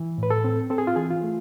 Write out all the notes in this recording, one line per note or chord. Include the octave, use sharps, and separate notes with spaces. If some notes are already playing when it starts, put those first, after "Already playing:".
Already playing: E3
A2 B4
A4
C4
C4 A4
G#4
F4
E3 G#4
F4
A3